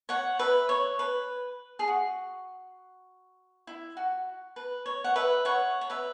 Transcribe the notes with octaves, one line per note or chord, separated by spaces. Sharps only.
C#5 F#5
B4 E5
C#5
B4
G#4
F#4
E4
F#4
B4
C#5
F#5
B4 E5
C#5 F#5
C#5
B4 E5